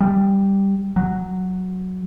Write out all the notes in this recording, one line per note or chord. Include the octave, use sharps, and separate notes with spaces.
G3
F#3